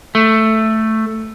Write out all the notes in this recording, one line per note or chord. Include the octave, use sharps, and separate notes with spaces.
A3